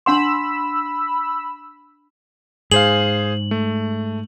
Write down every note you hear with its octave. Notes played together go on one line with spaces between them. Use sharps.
D4 F#5 B5 C6 E6
G#2 G#4 C5 F5 F#7
A3